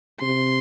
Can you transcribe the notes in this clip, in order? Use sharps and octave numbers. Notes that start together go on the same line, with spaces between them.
C3 C6